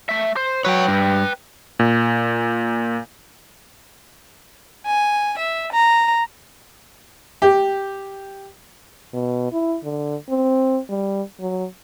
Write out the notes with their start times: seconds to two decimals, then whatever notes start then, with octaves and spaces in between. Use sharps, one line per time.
0.09 A3 E5
0.36 C5
0.65 F#3 B4 C#5 G5
0.88 G2
1.79 A#2
4.86 G#5
5.37 E5
5.72 A#5
7.42 G4
9.13 B2
9.53 E4
9.84 D3
10.29 C4
10.89 G3
11.40 F#3